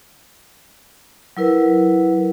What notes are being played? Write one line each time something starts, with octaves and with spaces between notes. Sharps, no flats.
F#3 E4 A#4 B4